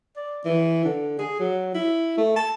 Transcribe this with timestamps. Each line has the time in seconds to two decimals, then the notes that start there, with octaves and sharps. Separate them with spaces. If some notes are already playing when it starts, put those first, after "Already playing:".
0.17 D5
0.45 E3
0.85 D3
1.19 G#4
1.39 F#3
1.74 E4
2.17 A3
2.36 A5